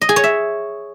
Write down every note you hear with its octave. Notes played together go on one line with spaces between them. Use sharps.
D#5
G#4
C#5
E5